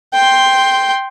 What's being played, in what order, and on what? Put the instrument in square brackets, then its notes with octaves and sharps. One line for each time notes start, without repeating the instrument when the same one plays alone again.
[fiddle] G5 C6